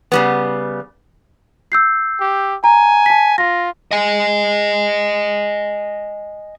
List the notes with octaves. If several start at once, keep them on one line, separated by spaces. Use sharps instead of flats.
C#3 G3 B3
E6 G6 C7
G4
G#5 A#5
A5 B6
F4 A#6
D#5 G#5